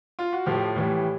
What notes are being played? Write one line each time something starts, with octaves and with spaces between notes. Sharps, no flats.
F4
F#4
A2 F3 A3 G4
A2 E3 G3